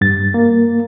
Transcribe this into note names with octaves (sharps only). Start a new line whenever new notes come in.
G2 A6
A#3